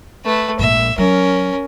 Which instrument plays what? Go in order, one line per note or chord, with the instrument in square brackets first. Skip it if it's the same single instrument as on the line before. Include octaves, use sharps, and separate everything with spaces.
[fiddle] A3 B4
[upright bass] A#1 G#2 [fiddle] E5
[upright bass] F#3 [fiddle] C#4 A#4